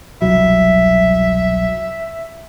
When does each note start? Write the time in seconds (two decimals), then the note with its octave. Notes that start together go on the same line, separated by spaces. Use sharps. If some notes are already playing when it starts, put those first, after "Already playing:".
0.22 E1 C2 F#3 E5